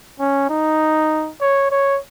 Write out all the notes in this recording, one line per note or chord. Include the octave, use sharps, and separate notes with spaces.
C#4
D#4
C#5
C#5